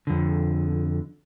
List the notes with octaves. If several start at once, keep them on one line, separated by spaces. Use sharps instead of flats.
F2 D3